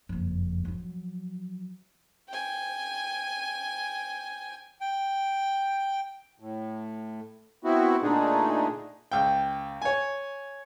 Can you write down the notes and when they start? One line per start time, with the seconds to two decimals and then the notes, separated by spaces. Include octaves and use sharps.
0.09 F#1 F2
0.65 F3 F#3
2.29 G5 G#5
4.81 G5
6.40 A2
7.64 B3 C4 E4 F#4
8.02 A#2 D3 A3 D4 D#4 G#4
9.12 C#2 G5
9.82 C#5 G#5